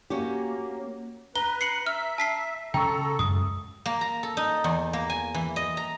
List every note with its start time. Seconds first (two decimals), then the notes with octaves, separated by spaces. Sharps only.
0.10 A#3 C#4 F#4 G4
1.36 B4 A#5 G7
1.61 C7 C#7 F#7
1.86 E5 F6
2.18 A5 B6 C7
2.74 C#3 A4 G5 A#5 C#6
3.19 F#2 F#3 G#3 D#6
3.86 A#3
4.01 A#5
4.23 A4
4.37 D#4
4.64 E2
4.93 A#3
5.10 G#5
5.34 E3
5.56 D#5
5.77 A#5